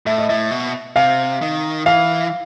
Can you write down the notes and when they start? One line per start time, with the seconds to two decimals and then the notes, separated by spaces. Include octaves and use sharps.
0.06 A2 E5
0.18 D#5
0.29 A2 E5
0.51 B2
0.96 C3 F5
1.42 D#3
1.86 E3 F5